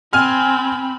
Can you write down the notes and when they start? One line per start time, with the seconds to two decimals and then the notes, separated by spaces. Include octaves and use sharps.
0.13 C4 G#5 B5 F6